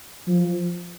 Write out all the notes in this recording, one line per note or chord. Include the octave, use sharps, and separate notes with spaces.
F3